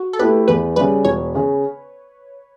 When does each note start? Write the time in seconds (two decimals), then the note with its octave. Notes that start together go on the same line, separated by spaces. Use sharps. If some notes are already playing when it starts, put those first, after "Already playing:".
Already playing: F#4
0.13 A4
0.19 A3 E4 G4 B4
0.48 E2 B4
0.76 C#3 G3 B4
1.05 E1 C#5
1.35 C#3